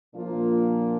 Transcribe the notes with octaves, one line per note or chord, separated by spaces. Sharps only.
A#2 F3 A#3 D4 F4